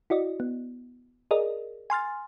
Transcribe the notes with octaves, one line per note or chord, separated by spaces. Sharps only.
E4 F#4 D5 D#5
B3
G#4 A#4 D5 D#5
G#5 C6 F6 A6